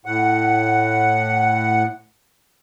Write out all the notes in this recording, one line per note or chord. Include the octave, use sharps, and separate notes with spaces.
A2 F#5